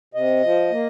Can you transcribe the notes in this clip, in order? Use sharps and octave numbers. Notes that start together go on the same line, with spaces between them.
C3 D#5
F3
A#3